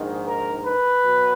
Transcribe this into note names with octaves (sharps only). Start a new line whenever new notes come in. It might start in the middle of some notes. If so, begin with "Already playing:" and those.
Already playing: A#1 G#2 D#3
A#4
B4
B2 F#3